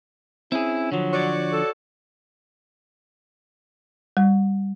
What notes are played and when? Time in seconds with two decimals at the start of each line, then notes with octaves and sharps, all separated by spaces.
0.52 C4 C#4 E4 G#4
0.92 D3 F3 F#3
1.12 F#4 C#5 D5
1.52 A4
4.17 G3